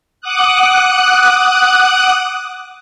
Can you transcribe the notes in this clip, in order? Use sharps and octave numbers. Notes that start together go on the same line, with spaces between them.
F#5 D6 D#6 F#6